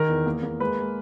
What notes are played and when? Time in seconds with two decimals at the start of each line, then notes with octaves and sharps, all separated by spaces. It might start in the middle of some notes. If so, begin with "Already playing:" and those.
Already playing: D#3 A#4
0.08 E2
0.26 A#3
0.43 A#3
0.60 G#3 B4
0.78 G#3